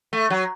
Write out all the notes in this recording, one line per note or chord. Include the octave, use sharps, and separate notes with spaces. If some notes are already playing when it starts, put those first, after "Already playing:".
A3
F#3